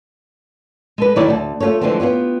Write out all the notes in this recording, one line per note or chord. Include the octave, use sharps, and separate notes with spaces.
G#3 A4 B4
D#3 F#3 A3 E4 C#5 D5
D2 G5 A5
A3 F4 G4 A4 C#5
D3 E3 F3 G#3 A3 C4
B3 F4 G4 C#5